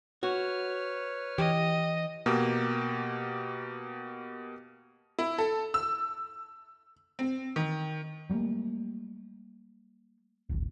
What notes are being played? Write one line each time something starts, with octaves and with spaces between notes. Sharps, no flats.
F#4 B4 C#5 F6
E3 G4 D#5
B2 A#3 G4
E4
A4
E6
C4
D#3
F#3 G3 A3 A#3
D1 G#1